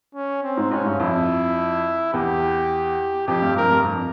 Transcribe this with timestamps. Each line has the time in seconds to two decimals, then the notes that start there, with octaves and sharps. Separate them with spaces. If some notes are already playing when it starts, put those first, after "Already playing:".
0.15 C#4
0.43 C4
0.57 G#2
0.71 G#2 C#4
0.85 G2
1.00 F2 E4
2.13 E2 G4
3.27 F2 G4
3.42 G2
3.56 F2 A#4
3.70 G2
3.85 F2